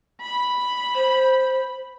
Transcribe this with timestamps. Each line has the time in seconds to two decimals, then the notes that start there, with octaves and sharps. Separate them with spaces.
0.21 B5
0.94 C5